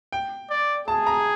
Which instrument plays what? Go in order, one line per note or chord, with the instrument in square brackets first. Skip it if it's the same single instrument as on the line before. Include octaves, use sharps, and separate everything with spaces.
[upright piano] G5
[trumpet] D5
[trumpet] G#4 [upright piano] A5
[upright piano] A#5